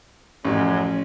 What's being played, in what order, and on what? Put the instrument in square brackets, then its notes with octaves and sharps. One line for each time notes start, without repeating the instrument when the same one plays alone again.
[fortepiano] A1 [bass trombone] F#2 [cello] F3 C#4